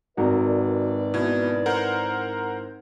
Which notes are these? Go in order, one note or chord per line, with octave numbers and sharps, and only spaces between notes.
G#1 F#4 A#4 B4 D5
B2 E4 G#6
A#4 C5 F#5